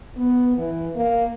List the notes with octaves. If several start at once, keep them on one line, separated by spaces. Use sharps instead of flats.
B3
E3
A#3